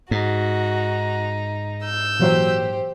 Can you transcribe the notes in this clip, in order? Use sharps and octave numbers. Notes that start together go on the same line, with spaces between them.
G#2 D#4 F#4
E6 G6
A#2 E3 F#3 G4 C5